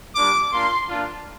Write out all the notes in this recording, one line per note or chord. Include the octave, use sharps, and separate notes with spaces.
G3 A#3 D4 F4 D6
A#3 D4 F4 C6
A#3 D4 F4